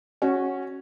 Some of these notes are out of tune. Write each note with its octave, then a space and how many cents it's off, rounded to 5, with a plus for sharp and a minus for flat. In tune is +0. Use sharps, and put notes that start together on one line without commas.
C#4 -10 F#4 +0